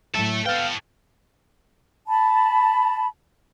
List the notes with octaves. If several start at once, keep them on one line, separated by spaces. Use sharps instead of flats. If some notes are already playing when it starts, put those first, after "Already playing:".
A2 F#3 A4 E5 A5
B3 A4 B4 F5 G5
A5 B5